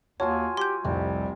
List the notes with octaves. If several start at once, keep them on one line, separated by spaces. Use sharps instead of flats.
D#2 F#3 F4 C#5 G#5 A5
G4 C6 G6
F1 C2 C3 G3